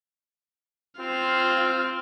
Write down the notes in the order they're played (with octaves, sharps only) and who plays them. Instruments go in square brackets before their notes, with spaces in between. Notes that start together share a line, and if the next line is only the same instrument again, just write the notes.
[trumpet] C4 [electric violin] F4 F6